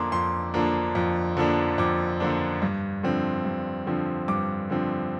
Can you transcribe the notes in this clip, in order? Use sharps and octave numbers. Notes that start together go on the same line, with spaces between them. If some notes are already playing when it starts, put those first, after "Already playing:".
Already playing: F2 D3 F3 A#3 D4 C6 D6
F2 C6
D3 F3 A#3 D4
F2
D3 F3 A#3 D4
F2 D6
D3 F3 A#3 D4
G2
D3 F3 C4
G2
D3 F3 C4
G2 D6
D3 F3 C4